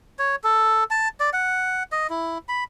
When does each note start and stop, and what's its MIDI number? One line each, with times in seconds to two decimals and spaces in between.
0.19 0.36 73
0.44 0.84 69
0.91 1.08 81
1.20 1.30 74
1.33 1.83 78
1.92 2.07 75
2.10 2.38 64
2.49 2.64 83